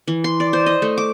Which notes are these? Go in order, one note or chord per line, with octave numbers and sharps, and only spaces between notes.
E3
C6
D5
C5
D#5
A3
D6